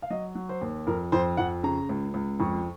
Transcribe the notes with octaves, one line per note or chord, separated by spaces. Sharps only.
F5
F#3 D#5
F#3
C5
D#2
F2 A#4
F2 C5
F2 F#5
C#3 A#5
C#2
C#2
F2 C#6